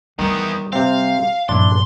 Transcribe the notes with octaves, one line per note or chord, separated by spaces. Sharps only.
E2 D#3 G3 B3
C3 C4 F5
G2 A#2 F3 D4 E4 C6